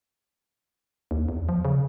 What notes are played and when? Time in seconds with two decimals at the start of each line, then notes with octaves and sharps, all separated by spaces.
1.11 D#2
1.29 E2
1.49 F3
1.65 C#3